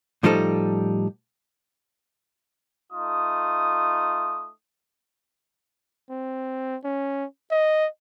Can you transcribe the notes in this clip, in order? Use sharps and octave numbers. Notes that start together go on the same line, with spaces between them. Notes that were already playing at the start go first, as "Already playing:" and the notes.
A2 F3 G3 D#4 A4
A3 D#4 F4 D#6
C4
C#4
D#5